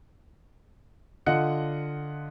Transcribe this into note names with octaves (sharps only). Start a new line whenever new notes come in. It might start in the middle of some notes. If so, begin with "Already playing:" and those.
D3 F4 D#5 F#5 F#6 C#7